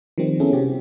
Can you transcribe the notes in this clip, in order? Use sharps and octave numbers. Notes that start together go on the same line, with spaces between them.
D#3 F3 G3 C4
B3 C#4 E4 G#4 A4
C3 C4 F#4 G4